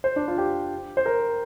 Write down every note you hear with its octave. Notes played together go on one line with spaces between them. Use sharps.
C5
D4
F4
G4
C5
A#4